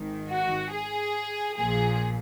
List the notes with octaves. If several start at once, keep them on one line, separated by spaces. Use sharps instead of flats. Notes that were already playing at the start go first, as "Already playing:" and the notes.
Already playing: G#1 G#2 D#3
F#4
G#4
A#1 A#2 F3 G#4